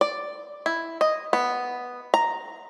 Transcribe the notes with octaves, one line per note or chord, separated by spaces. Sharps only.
D5
E4
D#5
B3
A#5